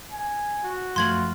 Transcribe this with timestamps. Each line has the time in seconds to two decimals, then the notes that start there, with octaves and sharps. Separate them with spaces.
0.11 G#5
0.64 F#4
0.96 F#2 F3 A3 F4 C6 G#6 F#7